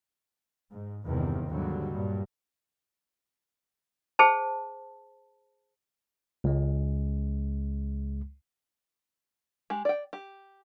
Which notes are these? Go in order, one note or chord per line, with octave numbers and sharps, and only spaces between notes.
G#2
E2 G2 C3 D#3
D#2 G#2 D3 F#3 G3
G2 A#2
G#4 C5 A5
C#2 G#3
G#3 G4
D5 G5
G4